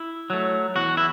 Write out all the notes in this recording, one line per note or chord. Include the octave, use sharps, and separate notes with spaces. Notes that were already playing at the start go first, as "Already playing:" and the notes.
Already playing: E4
F#3 A3
E2 F#4
E4